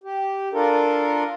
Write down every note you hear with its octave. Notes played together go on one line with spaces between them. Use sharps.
G4
D4 F4 A4 A#4